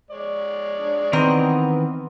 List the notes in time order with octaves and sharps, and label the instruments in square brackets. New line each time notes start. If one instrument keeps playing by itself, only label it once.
[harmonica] G#3 C#5 D5
[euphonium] D4
[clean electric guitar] D#3 E3 A#4 [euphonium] B3 [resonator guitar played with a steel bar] C4 D#5